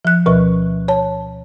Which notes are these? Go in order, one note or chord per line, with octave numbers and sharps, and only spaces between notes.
F3 F#6
D2 B2 F3 B4 C#6
C#5 A5